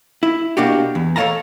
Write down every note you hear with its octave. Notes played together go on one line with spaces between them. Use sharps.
E4
B2 A#3 D4 F#4 G4
E2
A4 C#5 D5 F5 A5 A#5